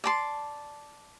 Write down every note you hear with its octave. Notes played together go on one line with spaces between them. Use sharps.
D5 A5 C6